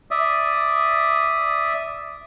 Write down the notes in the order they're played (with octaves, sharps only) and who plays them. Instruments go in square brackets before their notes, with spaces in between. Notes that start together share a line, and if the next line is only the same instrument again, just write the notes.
[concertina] D5 E5 D#6